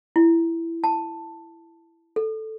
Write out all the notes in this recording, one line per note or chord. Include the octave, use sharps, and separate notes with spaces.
E4
A5
A4